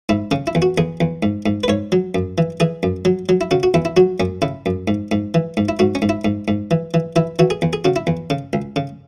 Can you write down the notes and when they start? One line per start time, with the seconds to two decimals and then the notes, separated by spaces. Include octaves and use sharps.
0.09 G#2 E4
0.31 C#3 C#4
0.47 E4
0.55 E2
0.62 F#4
0.78 E2 G#4
1.01 E2
1.23 G#2
1.46 G#2
1.64 B4
1.68 G#2 C#5
1.92 F#3
2.15 F#2
2.38 E3
2.60 E3 G#4
2.83 F#2
3.05 F#3
3.29 F#3
3.41 E4
3.51 C#3 F#4
3.63 F#4
3.74 E2 E4
3.85 E4
3.97 F#3 F#4
4.20 F#2 C#4
4.42 C#3 E4
4.66 F#2
4.88 G#2
5.12 G#2
5.34 E3
5.57 G#2
5.69 E4
5.79 G#2 F#4
5.95 C#4
6.02 G#2
6.09 E4
6.25 G#2
6.48 G#2
6.71 E3
6.94 E3
7.16 E3 E4
7.39 E3 F#4
7.50 G#4
7.62 E2
7.73 G#4
7.85 C#3 F#4
7.96 E4
8.07 E2
8.30 C#3
8.53 C#2
8.76 C#3